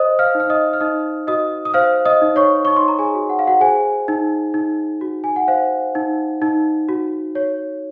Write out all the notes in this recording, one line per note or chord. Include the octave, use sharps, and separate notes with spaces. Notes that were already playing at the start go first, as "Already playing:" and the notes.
Already playing: C5 D#5 D#6
F5 F6
D#4
F6
D#5 D#6
F6
D#4 D#5 D#6
F#4 D#5 D#6
D#6
C5 F5 F6
D#5 D#6
D#4
C#5 C#6
D#4 C#6
C6
A#5
G#4 G#5
F#4
F#5
F5
F#4 F#5
G#4 C5 G#5
D#4
D#4
F#4
G#5
F#5
C5 F5
D#4
D#4
F#4
C#5